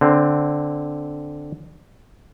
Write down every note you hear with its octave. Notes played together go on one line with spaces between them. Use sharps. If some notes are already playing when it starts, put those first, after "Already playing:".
D3 C4